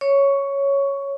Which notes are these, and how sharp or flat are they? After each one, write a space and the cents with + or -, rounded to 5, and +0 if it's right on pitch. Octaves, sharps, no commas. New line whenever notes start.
C#5 +0 C#6 +10